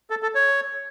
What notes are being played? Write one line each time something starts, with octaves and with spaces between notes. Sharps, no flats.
A4
A4
C#5